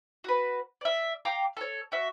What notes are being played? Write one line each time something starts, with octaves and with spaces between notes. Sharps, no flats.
F#4 B4
D5 E5
F5 G5 A#5 D6
A4 C#5
F#4 E5